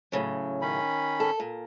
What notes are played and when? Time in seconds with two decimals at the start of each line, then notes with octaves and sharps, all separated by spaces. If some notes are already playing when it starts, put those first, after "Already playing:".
0.12 A2 C#3 F#3
0.61 D#3 C#4 B5
1.20 A4
1.40 A#2